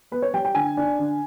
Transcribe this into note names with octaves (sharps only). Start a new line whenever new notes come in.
B3 B4
C#5
G3 G5
G5
D3 G#5
D4
D3